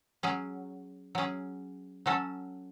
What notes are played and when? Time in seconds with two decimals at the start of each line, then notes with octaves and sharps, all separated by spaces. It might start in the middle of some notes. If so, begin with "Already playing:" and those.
0.23 F#3 C#4 G#4
1.15 F#3 C#4 G#4
2.06 F#3 C#4 F#4 A4